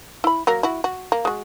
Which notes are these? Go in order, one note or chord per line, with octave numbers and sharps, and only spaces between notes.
E4 B5
F#3 A#3 A#4
E4 F#4
F#4
A#3
G#3 F#4